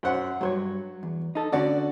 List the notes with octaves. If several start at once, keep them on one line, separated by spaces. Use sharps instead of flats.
F#2 C5 F#5
G2 F#3 C5 C#5
E2
D#4 A4
D2 D3 C#4 F#4 D5